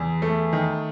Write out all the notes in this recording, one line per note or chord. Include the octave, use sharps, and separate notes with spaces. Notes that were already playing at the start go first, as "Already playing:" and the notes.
Already playing: E2
A3
D#3